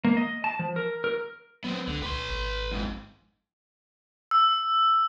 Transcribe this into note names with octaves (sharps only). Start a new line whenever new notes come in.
A#3
D#5
A5
F3
A#4
A#4
F#3 B3 C4
C#2 D3
C2 B4 C6
G#1
F2 G#2
E6